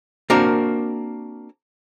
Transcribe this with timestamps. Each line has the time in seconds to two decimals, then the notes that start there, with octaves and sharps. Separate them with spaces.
0.30 A#3 C4 D4 F#4 A#4